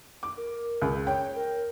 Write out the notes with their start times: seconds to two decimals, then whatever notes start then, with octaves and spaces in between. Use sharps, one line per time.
0.23 D6
0.37 A#4
0.82 C#2
1.07 C#5 G5
1.36 A#4